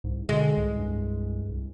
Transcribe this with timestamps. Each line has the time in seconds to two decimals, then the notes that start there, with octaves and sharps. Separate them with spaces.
0.04 C2 G#2
0.29 B2 D3 G#3
0.57 C2 G#2
0.78 G2
1.49 C2